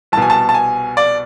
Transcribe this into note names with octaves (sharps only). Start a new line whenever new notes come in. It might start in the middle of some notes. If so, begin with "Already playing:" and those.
C2 A5
B2 G#5
A5
A5
G#5
D5